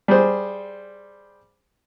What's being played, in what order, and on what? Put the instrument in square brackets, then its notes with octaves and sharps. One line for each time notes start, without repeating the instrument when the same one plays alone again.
[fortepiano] G3 G#4 C5